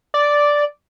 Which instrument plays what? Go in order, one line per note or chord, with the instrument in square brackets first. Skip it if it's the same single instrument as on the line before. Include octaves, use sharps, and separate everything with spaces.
[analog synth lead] D5